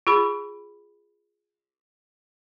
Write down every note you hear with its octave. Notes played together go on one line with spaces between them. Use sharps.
F4 G#4 B5